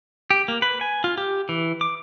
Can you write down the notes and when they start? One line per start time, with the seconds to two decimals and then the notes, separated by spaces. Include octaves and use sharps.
0.30 G4
0.48 A#3
0.62 B4
0.81 G#5
1.04 F4
1.18 G4
1.49 E3
1.81 D6